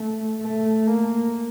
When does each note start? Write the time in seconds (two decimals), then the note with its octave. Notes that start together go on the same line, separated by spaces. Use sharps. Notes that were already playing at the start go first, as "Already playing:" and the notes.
Already playing: A3
0.42 A3
0.87 A#3